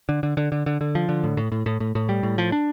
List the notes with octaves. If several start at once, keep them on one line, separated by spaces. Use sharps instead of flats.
D3
D3
D3
D3
D3
D3
F3
D3
A2
A2
A2
A2
A2
A2
G3
A2
F3
D4